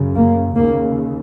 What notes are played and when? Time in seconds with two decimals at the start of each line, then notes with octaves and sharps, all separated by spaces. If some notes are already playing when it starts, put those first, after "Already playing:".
Already playing: F#2 C#3
0.15 A#3
0.56 D#2 C#3 A#3